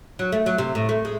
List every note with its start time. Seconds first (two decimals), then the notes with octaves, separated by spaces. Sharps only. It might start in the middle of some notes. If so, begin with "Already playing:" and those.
0.19 F#3
0.32 A3
0.46 F#3
0.58 C3
0.75 A2
0.89 A3
1.05 G#3